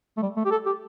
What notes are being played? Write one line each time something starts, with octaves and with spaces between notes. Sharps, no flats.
A3
G3
A3
G4
A4
G4